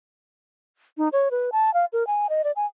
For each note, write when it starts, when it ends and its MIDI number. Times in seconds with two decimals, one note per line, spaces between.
0.98 1.09 63
1.13 1.29 73
1.31 1.50 71
1.52 1.73 81
1.74 1.85 77
1.93 2.06 70
2.07 2.27 80
2.30 2.42 75
2.44 2.52 74
2.56 2.66 80